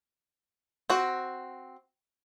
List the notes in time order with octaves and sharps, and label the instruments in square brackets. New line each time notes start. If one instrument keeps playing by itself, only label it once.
[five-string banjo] C4 F#4